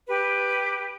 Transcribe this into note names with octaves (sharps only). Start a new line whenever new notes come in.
G4 B4